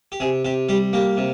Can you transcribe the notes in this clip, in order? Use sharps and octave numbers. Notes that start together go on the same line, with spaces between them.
G4
C3 G#4
C3 G4
G3 G4
A#3 G4
C3